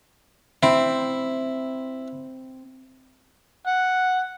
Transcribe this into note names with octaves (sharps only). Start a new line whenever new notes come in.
C4 E4
F#5